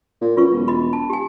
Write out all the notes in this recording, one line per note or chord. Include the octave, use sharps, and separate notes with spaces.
A#2
F#2 F4 B4 C#6
E1
D#5 B5
A5
G4 G#5